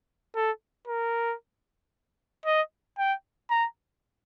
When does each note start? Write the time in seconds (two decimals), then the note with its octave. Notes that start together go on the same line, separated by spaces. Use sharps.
0.35 A4
0.88 A#4
2.45 D#5
2.98 G5
3.50 A#5